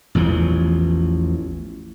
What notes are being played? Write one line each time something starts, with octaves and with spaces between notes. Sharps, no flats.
A1 E2 E3 F3